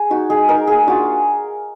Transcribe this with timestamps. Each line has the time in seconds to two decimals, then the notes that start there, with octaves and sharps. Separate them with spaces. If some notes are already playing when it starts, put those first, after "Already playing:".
Already playing: G#4
0.10 D#4 F#4
0.30 G#3 G#4
0.49 D#4 A#4
0.67 A#3 G#4
0.87 D4 F4 F#4